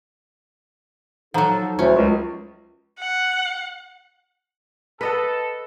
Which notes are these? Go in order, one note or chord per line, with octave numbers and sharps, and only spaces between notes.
F3 F#3 D#4 A4 F#5 A#5
D2 C#4 D#4 E4 C#5
C#2 F#4 A#4 B4 C#6
F#5
A4 B4 D#5 F#5